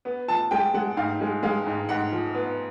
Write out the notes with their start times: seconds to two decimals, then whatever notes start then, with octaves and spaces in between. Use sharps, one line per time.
0.05 B3
0.28 F3 A5
0.51 G#3 G5
0.74 G#3 F#5
0.97 G#2 F5
1.21 G#3
1.43 G#3 F5
1.66 G#2
1.89 G#2 F#5
2.12 F3
2.34 B3